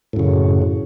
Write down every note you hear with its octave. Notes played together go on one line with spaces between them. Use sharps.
F#2 A2 C#3